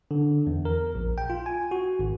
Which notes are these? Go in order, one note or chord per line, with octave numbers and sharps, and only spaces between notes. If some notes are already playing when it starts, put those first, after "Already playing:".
D3
E2
A#4
A#1
G5
F4
G#5
F#4
G#1